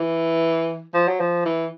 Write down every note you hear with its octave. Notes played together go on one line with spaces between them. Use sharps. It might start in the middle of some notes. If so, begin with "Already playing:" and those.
Already playing: E3
F3
F#3
F3
E3